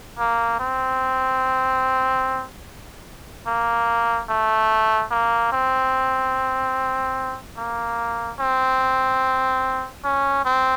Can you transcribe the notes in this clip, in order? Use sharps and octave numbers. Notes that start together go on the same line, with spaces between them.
A#3
C4
A#3
A3
A#3
C4
A#3
C4
C#4
C4